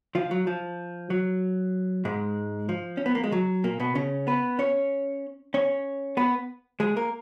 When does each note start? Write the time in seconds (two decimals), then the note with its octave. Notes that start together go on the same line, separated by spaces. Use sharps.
0.15 F3 F4
0.31 F#3
0.47 F3
1.10 F#3
2.05 G#2 G#3
2.69 F3
2.97 C#4
3.06 B3
3.15 A#3
3.24 G#3
3.32 F#3
3.64 A#2 A#3
3.80 B2 B3
3.95 C#3 C#4
4.27 B3 B4
4.59 C#4 C#5
5.54 C#4 C#5
6.17 B3 B4
6.80 G#3 G#4
6.96 A#3 A#4